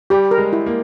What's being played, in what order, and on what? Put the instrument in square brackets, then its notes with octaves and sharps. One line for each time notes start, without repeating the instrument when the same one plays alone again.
[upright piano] G3 [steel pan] G4
[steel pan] A#4
[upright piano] G#3
[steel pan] E4
[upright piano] A#3